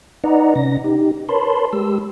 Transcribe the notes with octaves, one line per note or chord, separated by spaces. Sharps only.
D#4 B4 D5 D#5 F#5 A#5
C3 C#4 A#6
D#4 G4
A#4 B4 C#5 A5 B5 C6
G#3 G4 E6